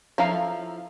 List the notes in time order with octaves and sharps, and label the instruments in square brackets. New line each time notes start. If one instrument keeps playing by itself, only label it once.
[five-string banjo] F3 E4 A4 F5 A#5